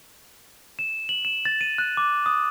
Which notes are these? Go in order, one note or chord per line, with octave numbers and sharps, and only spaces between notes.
E7
F#7
E7
A6
D#7
F#6
D6
D#6